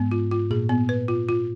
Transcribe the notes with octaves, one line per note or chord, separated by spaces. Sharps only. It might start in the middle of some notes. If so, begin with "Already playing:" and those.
Already playing: G#2 B3
F4
F4
A#2 G#4
B3
B4
F4
F4